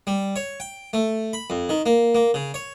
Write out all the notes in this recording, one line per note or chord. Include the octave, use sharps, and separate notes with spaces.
G3
C#5
G5
A3
B5
F2
D#3
A#3
A#3
C#3
C#5